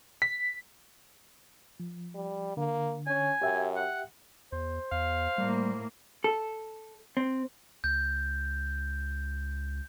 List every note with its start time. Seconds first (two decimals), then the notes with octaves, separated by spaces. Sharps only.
0.22 B6
1.80 F3
2.15 G3
2.57 D3 A#3
3.06 C#4 G#5
3.41 F#2 G4 E5 G5
3.76 F#5
4.52 E2 C5
4.92 E2 F5
5.38 A2 G3 A#3
6.24 A4
7.17 C4
7.84 C#2 G6